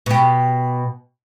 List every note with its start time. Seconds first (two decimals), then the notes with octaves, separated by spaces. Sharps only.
0.06 B2 G4